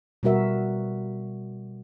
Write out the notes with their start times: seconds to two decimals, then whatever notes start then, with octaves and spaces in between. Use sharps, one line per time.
0.23 B2 G3 B3 F#4 A#4 E5